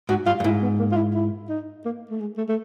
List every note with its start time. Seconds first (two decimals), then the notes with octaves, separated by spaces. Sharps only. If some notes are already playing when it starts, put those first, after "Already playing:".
0.09 G#2 F#4
0.26 G2 F4
0.40 G2
0.44 G#2 E4
0.62 B3
0.79 A#3
0.91 F4
0.96 E4
1.14 E4
1.49 D#4
1.85 A#3
2.11 A3
2.20 G#3
2.38 A3
2.49 A3